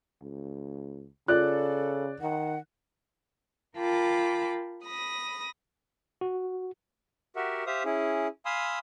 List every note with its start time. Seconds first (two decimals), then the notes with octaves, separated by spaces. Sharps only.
0.22 C#2
1.28 C#3 F4 A4 D5 F#6
2.21 D#3 F#5
3.76 F4 A#4 G5 A5 B5 D6
4.84 B5 D#6 A#6
6.21 F#4
7.36 F#4 G4 A#4 E5 F#5
7.66 G4 C5 E5 F5 D#6
7.85 C#4 E4 G#4
8.45 F5 G#5 B5 C6 D#6 E6